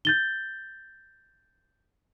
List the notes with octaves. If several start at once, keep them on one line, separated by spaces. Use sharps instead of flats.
G6 A6 G7